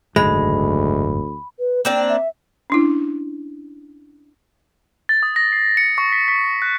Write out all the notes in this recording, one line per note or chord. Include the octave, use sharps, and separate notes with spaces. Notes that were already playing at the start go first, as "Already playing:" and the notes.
F#1 D2 G#2 D#3 G#3 B5
B4
A#3 C4 D4 G5
E5
C#4 D4 E4
A6
D#6
A#6
C7
C#7
C#6
B6
B6
F#6